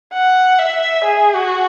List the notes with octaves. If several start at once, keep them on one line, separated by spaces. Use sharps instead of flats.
F#5
E5
G#4
F#4